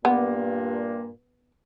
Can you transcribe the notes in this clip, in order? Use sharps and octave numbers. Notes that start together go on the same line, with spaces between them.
G2 A#2 A#3 B3